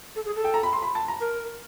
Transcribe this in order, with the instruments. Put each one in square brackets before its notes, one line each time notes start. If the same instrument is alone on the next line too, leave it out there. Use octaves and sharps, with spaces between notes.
[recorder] A4
G#4
A4
[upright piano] G5
A#5
B5
C6
B5
A5
A#5
[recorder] A#4